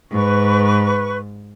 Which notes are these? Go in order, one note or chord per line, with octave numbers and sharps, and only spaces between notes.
G#2 B4 C#6